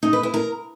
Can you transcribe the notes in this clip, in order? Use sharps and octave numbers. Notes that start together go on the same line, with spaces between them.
D#4
B4
E4
A#4